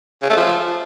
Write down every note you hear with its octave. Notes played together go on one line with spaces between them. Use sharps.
C#3
A3
F3